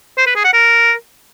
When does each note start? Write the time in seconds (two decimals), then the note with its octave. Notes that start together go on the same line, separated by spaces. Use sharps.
0.18 C5
0.27 B4
0.36 G#4
0.45 F#5
0.54 A#4